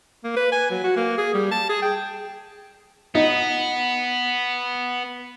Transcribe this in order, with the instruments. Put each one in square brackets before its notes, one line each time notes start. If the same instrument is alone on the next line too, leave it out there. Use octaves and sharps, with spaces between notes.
[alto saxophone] A#3
B4
G#5
F#3
F#4
A#3
G#4
G3
A5
G#4
G5
[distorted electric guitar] B3 [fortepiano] D#4